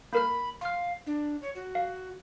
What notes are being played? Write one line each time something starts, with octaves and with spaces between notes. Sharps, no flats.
A#3 A#4 B5 F6
F5 C6 F6
D4
C#5
F#4
F5